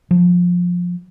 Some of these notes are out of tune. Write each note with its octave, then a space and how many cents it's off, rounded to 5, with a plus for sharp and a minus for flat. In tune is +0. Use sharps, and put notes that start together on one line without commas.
F3 +20